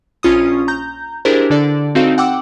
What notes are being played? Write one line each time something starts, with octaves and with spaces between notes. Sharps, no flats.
A#1 C#4 F4 C#6 D#6
A#5 G6
D4 E4 G4 G#4 A#4 C5
D3 D4 A4 D5
C4 D#4 F#4 A4 F5
F#5 G5 D6 E6